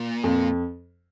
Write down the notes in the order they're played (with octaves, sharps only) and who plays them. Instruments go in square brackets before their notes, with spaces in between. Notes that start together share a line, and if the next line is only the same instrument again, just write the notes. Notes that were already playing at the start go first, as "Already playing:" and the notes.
Already playing: [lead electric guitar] A#2
[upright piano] F2